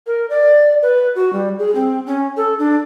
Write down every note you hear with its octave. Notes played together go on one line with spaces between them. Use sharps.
A#4
D5
B4
F#4
G3
G#4
C4
C#4
A4
D4